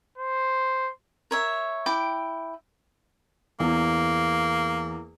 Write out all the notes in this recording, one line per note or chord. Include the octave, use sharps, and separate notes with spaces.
C5
A#4 C#5 E5
E4 G5 D6
E2 A#3